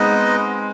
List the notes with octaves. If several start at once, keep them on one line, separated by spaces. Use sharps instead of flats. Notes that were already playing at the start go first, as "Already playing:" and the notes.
Already playing: G#3 B3 C4 D#4 B4 D#5